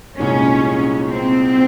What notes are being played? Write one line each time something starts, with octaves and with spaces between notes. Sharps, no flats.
C2 A#2 G#3 C#4 D#4
C4